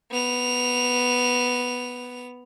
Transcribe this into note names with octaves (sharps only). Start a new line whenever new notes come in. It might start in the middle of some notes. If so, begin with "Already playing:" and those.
B3 F7